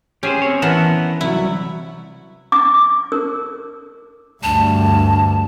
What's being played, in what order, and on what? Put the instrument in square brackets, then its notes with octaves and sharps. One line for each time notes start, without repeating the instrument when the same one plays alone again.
[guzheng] C#4 [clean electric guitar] G4 G#4 C5
[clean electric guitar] C4 C#5
[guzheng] E3 F#5 [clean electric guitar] B3 A#4 A5
[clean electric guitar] C2 F#3 [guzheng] E4
[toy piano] D6
A#4
[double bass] D2 G2 [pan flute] A5